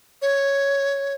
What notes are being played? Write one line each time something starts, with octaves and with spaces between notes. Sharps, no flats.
C#5